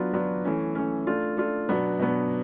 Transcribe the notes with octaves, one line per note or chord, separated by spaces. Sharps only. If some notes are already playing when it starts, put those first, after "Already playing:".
Already playing: F#3 B3 D4 F4
F#3 B3 D4 F4
E3 A3 C#4
E3 A3 C#4
A3 D4 F4
A3 D4 F4
B2 F#3 B3 D4
B2 F#3 B3 D4